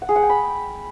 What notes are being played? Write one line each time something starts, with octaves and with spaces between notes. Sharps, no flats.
F#5
G#4
F#5
G5
B5